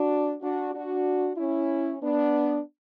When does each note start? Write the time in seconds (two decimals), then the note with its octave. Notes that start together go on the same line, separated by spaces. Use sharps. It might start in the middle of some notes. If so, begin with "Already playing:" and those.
Already playing: D4 F#4
0.41 D4 F#4
0.74 D4 F#4
1.37 C#4 E4
2.02 B3 D4